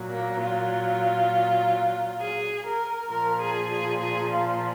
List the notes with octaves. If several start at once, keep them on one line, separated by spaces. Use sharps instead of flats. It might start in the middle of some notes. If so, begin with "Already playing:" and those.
Already playing: A#2 F#3
A#3
F4
G#4
A#4
A#2 F3 A#4
G#4
G#4
G#4
F4